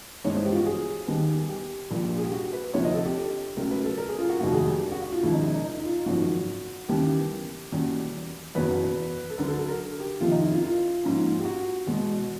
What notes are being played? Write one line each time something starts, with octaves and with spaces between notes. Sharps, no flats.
G2 E3 G#3 B3 C#5
C5
G4
F4
F#4
G#4
D#2 D#3 G3 B3
G4
A#1 A#2 G3
G#4
G4
F#4
B4
D2 C3 F3 C#5
D#5
A4
G4
C#2 B2 F#3 A3 A#4
B4
A4
A#4
G#4
F4
F#4
F1 D#2 D#3 F#3 A3 F#4
G#4
G4
F#4
F#4
F4
E1 D#2 C#3 F3 E4
D#4
E4
D#4
D#4
F4
G#1 F#2 C#3 F3 F#4
D#2 C#3 E3 G3 B3 G4
E2 B2 G3 A#3 C#4
F#1 E2 B2 F#3 B4
A4
D2 D3 F#3 A#4
A4
A4
A#4
G4
F2 C3 D#3 F4
D#4
E4
F4
F4
G#2 F3 A#3 C#4
G4
F#4
E2 B2 G#3